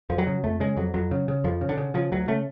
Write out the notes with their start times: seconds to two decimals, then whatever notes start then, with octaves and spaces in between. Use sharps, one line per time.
0.10 F2 F3
0.18 F#3
0.27 C#3
0.44 F2 A3
0.60 C#3 G#3
0.77 F2 F#3
0.94 F2 F#3
1.11 C#3
1.28 C#3
1.44 F2 F3
1.61 C#3
1.69 D3
1.78 C#3
1.94 C#3 F3
2.12 D2 F#3
2.28 C#3 A3